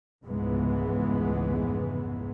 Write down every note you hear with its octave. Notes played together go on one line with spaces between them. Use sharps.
F1 C#2 G#2 E3 G#3 B3